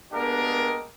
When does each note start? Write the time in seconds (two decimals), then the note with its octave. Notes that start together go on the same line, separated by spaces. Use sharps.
0.12 G#3 A#3 B3 D4 G4 A#4